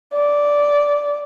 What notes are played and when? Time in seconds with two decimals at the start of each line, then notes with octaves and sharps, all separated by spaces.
0.14 D5